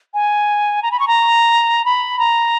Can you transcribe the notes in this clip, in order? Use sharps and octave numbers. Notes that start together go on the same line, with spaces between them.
G#5
A#5
B5
C#6
A#5
B5
A#5